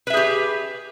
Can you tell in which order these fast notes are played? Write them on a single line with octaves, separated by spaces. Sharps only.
B4 E5 G#4 G4